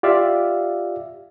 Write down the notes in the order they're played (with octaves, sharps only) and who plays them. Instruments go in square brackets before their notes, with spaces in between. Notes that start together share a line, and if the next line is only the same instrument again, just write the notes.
[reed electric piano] F4 G4 D5 E5 F5